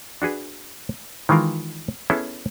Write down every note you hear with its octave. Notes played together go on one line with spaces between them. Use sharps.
D4 F#4 G#4 B4
D#3 E3 G#3 F4 A#4
B3 C#4 E4 G#4 A4